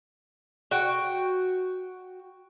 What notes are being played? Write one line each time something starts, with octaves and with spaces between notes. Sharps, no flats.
F#4 G5